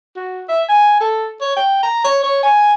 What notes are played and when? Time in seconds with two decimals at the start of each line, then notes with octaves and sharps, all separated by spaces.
0.16 F#4
0.49 E5
0.69 G#5
1.00 A4
1.41 C#5
1.56 G5
1.83 A#5
2.04 C#5
2.23 C#5
2.43 G#5